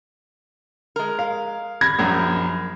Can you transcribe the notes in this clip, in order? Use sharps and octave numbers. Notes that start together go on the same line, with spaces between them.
G#3 A#4
F5
G3 B5 G#6 A#6
A#1 F#2 A#4